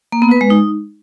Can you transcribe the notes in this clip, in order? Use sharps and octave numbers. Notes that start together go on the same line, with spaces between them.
A#3
B3
B4
G#3
D#4